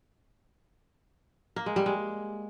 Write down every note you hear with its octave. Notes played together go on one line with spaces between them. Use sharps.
A#3
G#3
G3
G#3